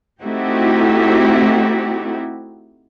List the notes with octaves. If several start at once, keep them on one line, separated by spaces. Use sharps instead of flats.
A3 C4 D#4 E4 F#4 G4